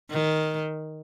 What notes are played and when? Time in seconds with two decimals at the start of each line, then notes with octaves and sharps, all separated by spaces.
0.11 D#3